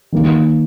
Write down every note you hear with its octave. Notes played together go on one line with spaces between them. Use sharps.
D#3 A#3